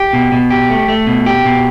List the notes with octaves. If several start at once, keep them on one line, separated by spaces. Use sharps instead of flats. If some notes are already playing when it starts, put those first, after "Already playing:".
Already playing: G4
B2
B2
G4
A3
A3
B2
G4
B2